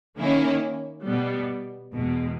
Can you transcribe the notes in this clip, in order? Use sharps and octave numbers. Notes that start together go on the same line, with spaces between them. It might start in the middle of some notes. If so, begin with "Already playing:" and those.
D#3 A#3 C#4 E4
B2 G3 B3
E2 B2 G#3